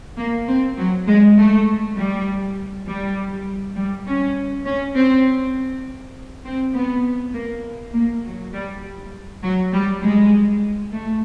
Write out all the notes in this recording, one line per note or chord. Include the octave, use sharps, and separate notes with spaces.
A#3
C4
F#3
G#3
A3
G3
G3
G3
C#4
C#4
C4
C4
B3
A#3
A#3
F#3
G3
F#3
G3
G#3
A3